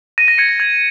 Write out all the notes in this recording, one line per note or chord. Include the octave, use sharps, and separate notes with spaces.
A#6 D#7
A#6 D#7
G#6 C#7
A#6
G#6